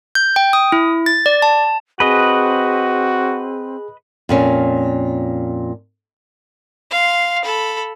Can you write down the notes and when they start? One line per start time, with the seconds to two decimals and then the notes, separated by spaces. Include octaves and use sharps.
0.15 G6
0.36 G5
0.53 D#6
0.72 E4
1.06 A6
1.26 D5
1.42 A5
2.00 C4 F#4 G#4 B4 D#5
4.29 F2 A#2 C#4
6.91 F5 C6
7.44 A4 B5